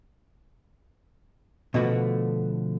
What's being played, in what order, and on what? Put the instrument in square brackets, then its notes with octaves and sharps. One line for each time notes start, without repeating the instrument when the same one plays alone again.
[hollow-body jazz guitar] B2 D3 F3 A3 F#4 B4